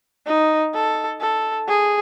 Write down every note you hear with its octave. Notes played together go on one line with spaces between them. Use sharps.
D#4
A4
A4
G#4